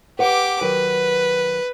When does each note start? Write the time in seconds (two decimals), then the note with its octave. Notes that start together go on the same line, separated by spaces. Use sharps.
0.19 G4 B4 F#5 D6
0.61 D#3 F#3 B4